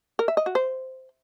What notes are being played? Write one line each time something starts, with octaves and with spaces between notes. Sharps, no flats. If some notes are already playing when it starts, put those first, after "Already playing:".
A#4
E5
D#5
F#4
C5